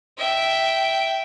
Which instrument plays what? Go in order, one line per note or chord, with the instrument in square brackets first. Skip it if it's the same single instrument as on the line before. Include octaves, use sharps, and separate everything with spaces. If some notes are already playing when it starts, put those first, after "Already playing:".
[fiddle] E5 G5